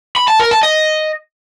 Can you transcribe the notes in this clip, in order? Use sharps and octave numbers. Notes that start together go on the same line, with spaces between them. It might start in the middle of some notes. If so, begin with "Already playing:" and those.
B5
A5
A#4
A5
D#5